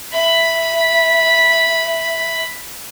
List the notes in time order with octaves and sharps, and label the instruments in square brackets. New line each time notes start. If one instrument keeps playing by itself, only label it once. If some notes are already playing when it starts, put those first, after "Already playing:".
[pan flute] E5 [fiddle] B5